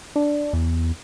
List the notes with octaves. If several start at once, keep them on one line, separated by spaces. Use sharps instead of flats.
D4
E2